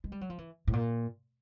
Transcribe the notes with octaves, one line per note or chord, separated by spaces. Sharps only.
G#3
G3
F#3
F3
E3
A2
A#2